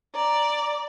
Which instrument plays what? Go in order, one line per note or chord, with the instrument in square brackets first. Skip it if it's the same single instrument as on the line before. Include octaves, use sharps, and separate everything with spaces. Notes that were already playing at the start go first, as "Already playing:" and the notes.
[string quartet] D5 [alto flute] A#5